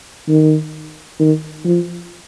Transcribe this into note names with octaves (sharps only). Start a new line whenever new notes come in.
D#3
D#3
F3